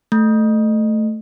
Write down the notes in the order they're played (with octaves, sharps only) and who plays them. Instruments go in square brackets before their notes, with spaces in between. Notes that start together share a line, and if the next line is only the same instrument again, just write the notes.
[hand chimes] A3